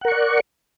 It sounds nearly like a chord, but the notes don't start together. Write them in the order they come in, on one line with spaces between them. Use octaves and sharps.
F#5 A#4 C#6 D5